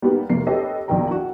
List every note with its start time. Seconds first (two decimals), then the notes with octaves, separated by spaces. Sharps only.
0.02 G3 A#3 B3 D#4
0.30 F1 A#3 C7
0.46 G4 A4 B4 C#5 D#5
0.88 A#1 B2 D#3 G5 A#5
1.11 F#4